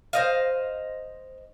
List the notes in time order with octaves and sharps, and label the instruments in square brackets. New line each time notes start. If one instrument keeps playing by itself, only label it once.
[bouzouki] C5 D#5 F5